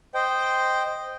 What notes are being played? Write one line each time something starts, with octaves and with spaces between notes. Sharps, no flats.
C5 D#5 G5